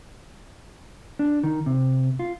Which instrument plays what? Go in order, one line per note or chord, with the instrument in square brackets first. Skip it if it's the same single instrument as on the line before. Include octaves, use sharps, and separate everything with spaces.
[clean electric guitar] D4
D#3
C3
F4